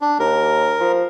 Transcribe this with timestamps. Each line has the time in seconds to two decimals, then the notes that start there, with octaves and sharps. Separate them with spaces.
0.01 D4
0.19 D#2 A#4
0.80 F3